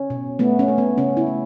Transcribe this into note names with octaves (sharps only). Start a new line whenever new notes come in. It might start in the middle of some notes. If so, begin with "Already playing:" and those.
Already playing: C#4
B2
A3 B3
C#4
A3
B3
C#3 C#4
E4
A3